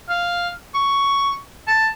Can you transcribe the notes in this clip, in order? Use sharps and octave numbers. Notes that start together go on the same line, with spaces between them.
F5
C#6
A5